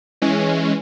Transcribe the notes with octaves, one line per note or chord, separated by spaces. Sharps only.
E3 G#3 C#4